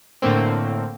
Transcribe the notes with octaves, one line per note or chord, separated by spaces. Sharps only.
A2 D3 A3 A#3 C4